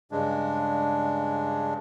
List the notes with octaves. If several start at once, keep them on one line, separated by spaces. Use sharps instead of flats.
G2 C#3 G#3 D4